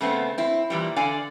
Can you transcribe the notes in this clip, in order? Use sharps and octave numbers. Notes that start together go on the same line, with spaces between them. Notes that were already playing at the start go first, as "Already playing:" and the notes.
C#3 A3 B3 C4
C4 E4
A#2 E3 G3
D3 D5 F5 G#5